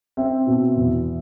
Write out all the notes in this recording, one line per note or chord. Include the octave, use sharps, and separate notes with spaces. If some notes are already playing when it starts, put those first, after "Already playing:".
C4 E5
B2
E2